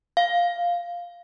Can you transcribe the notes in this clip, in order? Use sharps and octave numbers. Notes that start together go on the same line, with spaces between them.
F5